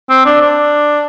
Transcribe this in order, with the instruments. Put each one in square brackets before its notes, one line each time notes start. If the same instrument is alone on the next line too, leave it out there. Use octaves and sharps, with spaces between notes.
[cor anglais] C4
D4
D4